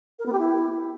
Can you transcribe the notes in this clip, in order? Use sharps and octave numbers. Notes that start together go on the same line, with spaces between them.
A#4
B3
G4
E4